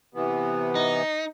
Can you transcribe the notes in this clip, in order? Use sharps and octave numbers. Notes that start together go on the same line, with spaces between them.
C3 E3 B3
D#4